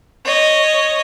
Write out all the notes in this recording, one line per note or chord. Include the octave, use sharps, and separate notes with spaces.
C#5 D#5